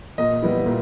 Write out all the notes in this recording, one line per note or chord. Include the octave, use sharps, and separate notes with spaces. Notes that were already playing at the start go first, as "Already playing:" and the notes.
A#2 D#5
G3 B3 E4
A#2